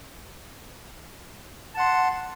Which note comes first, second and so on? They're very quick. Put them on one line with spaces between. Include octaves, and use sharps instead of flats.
A5 F#5 C6